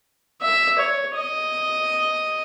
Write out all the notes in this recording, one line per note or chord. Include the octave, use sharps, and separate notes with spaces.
E5
C#5
D#5